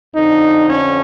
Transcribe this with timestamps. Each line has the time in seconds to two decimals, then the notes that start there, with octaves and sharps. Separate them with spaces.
0.15 F2 D3 D#4
0.69 C#4